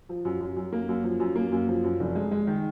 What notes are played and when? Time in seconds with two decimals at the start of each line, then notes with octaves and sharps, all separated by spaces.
0.09 F3
0.25 F#2
0.41 F#2
0.56 F#2
0.72 A#3
0.89 F#2
1.04 F3
1.20 F#2
1.36 A#3
1.52 F#2
1.68 F3
1.84 F#2
2.00 F1
2.15 G#3
2.31 G#3
2.47 D#3